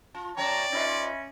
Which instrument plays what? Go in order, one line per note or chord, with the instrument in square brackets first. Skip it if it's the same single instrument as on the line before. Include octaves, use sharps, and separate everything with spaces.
[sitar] F4 [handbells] A5
[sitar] F#2 B3 C#5 [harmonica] D5 [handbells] G5 [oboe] A#5
[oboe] C#4 [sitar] D#4 F4 B4 [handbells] E5 B5 A#6